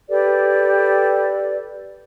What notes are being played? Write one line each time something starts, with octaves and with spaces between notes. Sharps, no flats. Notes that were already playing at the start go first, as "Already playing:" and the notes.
G4 A4 B4 D5